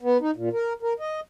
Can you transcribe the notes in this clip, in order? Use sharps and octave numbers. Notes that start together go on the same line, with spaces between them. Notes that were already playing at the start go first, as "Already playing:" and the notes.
B3
D#4
A#2
A#4
A#4
D#5